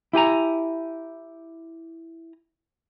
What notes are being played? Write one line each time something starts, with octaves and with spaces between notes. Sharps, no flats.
E4 G4 G#5 A#5